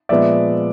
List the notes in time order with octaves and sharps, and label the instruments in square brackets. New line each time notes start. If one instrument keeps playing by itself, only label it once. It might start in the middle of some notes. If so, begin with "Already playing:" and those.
[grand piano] A#2 F3 G#3 B3 D5 E5